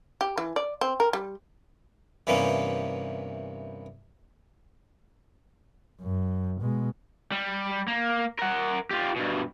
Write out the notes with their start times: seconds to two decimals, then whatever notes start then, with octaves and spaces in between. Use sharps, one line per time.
0.21 G4
0.38 E3
0.56 D5
0.81 C4
1.00 A#4
1.13 G3
2.27 G2 C3 E3 A#3 B3 C#4
6.01 F#2
6.61 B2 G#3
7.31 G3
7.88 A#3
8.39 A#4 F#5
8.91 F4 G4
9.16 G2 B2